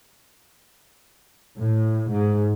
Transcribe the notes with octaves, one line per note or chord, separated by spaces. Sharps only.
A2
G#2